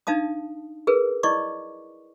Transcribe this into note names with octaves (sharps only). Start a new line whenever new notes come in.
D4 D#4 F5 A5 D#6
G#4 A#4 B4
E4 D5 D#5 C#6 D6